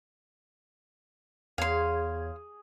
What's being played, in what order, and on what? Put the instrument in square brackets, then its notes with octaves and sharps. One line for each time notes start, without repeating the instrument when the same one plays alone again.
[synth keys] E2 C#5 G#6 [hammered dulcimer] G#4 [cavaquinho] F5 C6